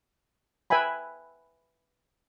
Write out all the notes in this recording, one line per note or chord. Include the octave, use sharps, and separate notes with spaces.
B4 E5 G5 G#5 B5